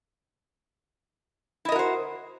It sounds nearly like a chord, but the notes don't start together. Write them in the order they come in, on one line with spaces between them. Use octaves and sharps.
E4 D#5 A#4 F#4 C5